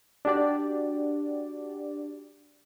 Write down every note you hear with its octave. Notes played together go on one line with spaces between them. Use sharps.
D4 F#4 G4 D5